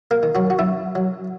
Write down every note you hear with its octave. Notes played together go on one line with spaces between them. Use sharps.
A#3 A#4
D#3
F#3 F#4
F#4
F#2 E4
F#3